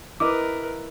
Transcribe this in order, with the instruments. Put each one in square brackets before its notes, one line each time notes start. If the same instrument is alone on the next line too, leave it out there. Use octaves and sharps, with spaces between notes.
[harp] E4 D#5 [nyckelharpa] A#4 B4 [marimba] D6